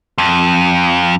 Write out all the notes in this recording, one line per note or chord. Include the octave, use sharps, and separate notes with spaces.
F2